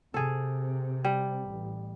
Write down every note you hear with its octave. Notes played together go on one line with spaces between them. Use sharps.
C3 G#4 A4
G3
A1